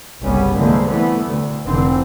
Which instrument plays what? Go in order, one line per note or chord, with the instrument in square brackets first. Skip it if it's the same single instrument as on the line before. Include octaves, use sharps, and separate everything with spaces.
[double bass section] G1 C2 C#3 G3 B3 C#4
C2 D3 E3 G#3 A#3 C4
E3 A3 B3
D2
F1 D3 E3 C4